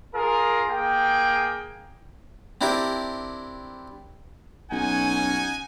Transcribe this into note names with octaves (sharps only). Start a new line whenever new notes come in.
F4 G#4 A#4
A#3 G#4 G5
C4 D4 E4 G4 A#4
B1 C#4 D#4 F#5 G#5